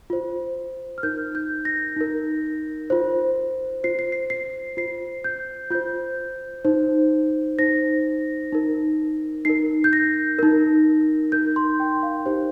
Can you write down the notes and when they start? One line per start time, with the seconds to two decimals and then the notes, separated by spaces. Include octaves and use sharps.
0.10 F4 C5
0.98 F6
1.03 D#4 A#4 G6
1.35 G6
1.65 A#6
1.96 D#4 A#4
2.90 F4 C5
3.84 F4 C5 C7
3.99 C7
4.12 C7
4.30 C7
4.77 F4 C5 C7
5.24 G6
5.70 F4 C5 G6
6.65 D#4 C5
7.58 D#4 C5 A#6
8.52 D#4 A#4
9.45 D#4 A#4 C7
9.84 G6
9.93 A#6
10.39 D#4 A#4
11.32 D#4 A#4 G6
11.56 C6
11.80 G5
12.03 F5
12.26 D#4 G4 C5